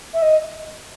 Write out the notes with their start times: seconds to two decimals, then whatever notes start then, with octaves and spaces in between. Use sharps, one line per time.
0.14 E5
0.22 D#5